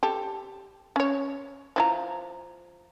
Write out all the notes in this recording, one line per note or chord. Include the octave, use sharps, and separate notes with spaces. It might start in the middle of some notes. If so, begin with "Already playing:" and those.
G4 A4
C#4 C#5
F3 E4 A#5